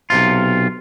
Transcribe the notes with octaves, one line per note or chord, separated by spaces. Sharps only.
B1 C3 F4